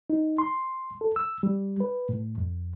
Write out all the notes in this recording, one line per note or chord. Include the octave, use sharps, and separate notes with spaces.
D#4
C6
A4
E6
G3
B4
A2
F2